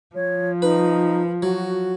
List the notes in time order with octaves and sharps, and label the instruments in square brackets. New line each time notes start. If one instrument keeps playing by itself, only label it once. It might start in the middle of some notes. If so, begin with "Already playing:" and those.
[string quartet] F3 [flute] C#5
[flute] D#4 [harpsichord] B4
[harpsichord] F#3 [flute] F#4